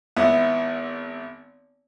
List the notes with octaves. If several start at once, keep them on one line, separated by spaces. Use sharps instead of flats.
G#1 B3 E4